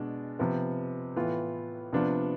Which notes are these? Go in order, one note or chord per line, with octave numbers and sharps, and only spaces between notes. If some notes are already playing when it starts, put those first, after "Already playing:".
Already playing: B2 G#3 D4
C3 F3 B3
A2 E3 B3 F4
C3 F3 B3 D4 F4